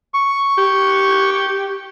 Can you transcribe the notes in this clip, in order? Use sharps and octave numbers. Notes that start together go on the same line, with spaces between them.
C#6
G4